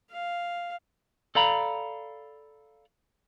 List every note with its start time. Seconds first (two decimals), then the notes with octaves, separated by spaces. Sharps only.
0.12 F5
1.35 A4 D5 F5 A#5 B5